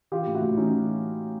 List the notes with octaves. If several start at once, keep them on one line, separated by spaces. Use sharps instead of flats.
E3 F4 G4
A2
E4 F#4
A2
E3 C#4 D#4
E3